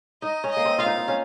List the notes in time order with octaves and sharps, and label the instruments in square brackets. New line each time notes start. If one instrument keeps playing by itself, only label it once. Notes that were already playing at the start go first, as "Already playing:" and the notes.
[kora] D#4 [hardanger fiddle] D#5
[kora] C#4
[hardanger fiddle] D#5
[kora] A#3
C4
[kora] F4 [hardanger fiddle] F5
[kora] D#4
D#4
C#4